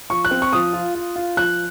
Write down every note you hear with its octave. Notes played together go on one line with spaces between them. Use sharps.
F3 C#6
F#6
C4
C#6
F3 D#6
F4
F4
F4
F3 F#6